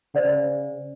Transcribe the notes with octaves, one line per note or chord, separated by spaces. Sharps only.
C#3 C5 D5 F#5